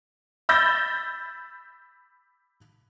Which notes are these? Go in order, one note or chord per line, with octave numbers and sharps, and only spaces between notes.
B5 E6 G6 A6 A#6